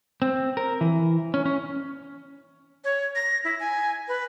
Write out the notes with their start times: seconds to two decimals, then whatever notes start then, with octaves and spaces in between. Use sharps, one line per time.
0.22 C4
0.57 A#4
0.81 E3
1.34 C#4
1.46 C#4
2.84 C#5
3.15 A#6
3.44 E4
3.60 G#5
4.08 B4